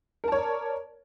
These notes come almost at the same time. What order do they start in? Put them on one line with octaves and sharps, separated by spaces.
A#4 A5 C#5 D5